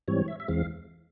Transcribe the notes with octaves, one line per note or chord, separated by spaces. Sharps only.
G#2 E3 G3 C4 C#5
E5
E5
E2 E3 G#3 C4 F5